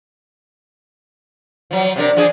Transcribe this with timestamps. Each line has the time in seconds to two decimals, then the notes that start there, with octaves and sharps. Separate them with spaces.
1.71 F3 F#3
1.96 C3 D4 A#4
2.17 F3 D4 G#4